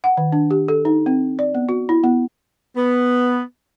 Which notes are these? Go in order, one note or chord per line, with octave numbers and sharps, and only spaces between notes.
F#5
D#3
D4
G4
A4
D#4
C4
D5
B3
F#4
E4
B3
B3